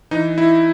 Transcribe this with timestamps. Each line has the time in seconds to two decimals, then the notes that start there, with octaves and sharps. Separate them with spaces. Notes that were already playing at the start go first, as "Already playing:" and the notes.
0.11 E3 D#4
0.38 E4